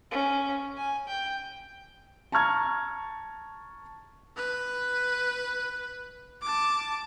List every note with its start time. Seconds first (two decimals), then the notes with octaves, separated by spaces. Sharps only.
0.11 C#4
0.77 G#5
1.08 G5
2.32 A5 A#5 C#6 F6 G#6
4.36 B4
6.42 A5 D6